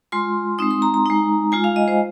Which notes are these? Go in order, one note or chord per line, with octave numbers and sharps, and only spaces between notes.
G#3 F4 C6
G#3 C4 D#4 D#6
C6
A#5
A#5
G#3 D#4
G#3 F4 G#5
F5
D#5
C5